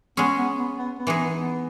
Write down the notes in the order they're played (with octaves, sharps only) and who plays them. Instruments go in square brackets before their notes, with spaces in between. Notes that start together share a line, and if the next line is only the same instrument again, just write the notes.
[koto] G#3 C#4 G#4 [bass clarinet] B3
[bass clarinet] B3
B3
B3
B3
[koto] E3 G#3 D#4 G#4
[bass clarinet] B3
B3